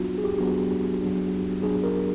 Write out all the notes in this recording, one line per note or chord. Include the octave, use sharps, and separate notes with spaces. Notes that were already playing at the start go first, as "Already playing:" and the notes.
Already playing: F#3 B3 D4 F4 F#4
G#4
G4
F#3 B3 D4 F#4
F#3 B3 D4
F#3 B3 D4 G#4
A#4